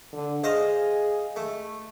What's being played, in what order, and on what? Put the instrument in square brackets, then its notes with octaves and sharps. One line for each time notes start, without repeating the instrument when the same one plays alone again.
[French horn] D3
[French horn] G#4 [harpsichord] C5 D#5 F5
[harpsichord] A3